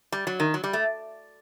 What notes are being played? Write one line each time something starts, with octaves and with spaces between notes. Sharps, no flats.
G3
F#3
D#3
F#3
G3
A3